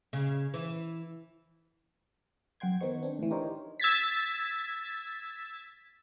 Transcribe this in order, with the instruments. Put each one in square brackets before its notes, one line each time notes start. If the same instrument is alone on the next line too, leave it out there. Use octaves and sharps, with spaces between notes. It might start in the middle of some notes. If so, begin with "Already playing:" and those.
[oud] C#3
E3
[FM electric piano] F#2 F#5 G5 C6 G#6
D#3 B3 D#4 C5 C#6
C4 D4
A2 E3
D4 D#4 G4 A#4 C5 C#5
[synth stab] E6 G#6 A6 B6